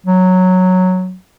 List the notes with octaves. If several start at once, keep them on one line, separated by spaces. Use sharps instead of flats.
F#3